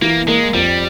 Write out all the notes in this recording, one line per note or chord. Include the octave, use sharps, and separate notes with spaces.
E3 A#3
G#3 A#3
F2 G3